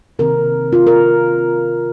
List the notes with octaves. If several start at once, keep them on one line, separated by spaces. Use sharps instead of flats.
C3 D#3 C4 A#4
F4
A#4